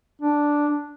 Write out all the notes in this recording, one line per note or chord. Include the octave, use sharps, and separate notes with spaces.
D4